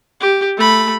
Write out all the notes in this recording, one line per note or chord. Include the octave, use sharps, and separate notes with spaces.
G4
A3 B5